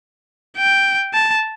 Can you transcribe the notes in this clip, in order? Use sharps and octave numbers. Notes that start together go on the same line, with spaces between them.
G5
A5